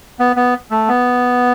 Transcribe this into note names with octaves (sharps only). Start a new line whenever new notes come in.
B3
B3
A3
B3